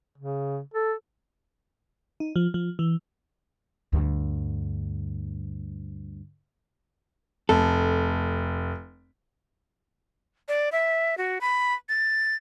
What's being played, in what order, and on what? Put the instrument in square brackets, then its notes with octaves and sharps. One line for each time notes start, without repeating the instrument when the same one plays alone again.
[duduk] C#3
A4
[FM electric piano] D#4
F3
F3
E3
[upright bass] D2 G2
[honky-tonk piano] F1 [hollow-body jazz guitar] A4
[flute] D5
E5
F#4
B5
A6